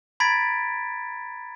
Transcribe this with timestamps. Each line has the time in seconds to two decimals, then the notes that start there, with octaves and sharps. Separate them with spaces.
0.20 A#5 B5 G#6 A6 B6 D7